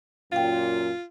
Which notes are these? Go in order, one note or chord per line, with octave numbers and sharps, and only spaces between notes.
F#2 A#2 F4 F5 G5